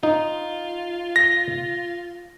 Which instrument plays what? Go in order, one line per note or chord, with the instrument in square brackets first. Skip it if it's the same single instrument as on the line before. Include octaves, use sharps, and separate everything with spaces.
[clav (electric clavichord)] D#4 [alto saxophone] F4
[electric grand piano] A#6